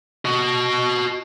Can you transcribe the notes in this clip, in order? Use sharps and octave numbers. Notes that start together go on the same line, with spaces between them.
F#4 D#5